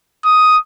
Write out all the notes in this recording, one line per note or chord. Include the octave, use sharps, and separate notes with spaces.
D#6